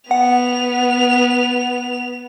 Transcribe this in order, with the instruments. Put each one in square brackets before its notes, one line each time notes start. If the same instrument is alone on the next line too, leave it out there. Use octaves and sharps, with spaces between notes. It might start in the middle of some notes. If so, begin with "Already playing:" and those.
[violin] B3 F7 [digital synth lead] F#5